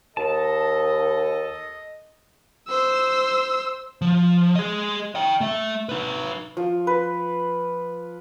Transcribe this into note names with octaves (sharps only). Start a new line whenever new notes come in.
D#2 A4 D#5 A5
C5 E6
F3
G#4 D#5
D#5 G5
A3 E5
D#4 B4
F3
B4